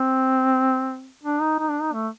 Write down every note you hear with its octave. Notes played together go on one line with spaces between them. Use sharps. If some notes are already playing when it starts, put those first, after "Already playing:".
Already playing: C4
D4
D#4
D#4
D4
D#4
A3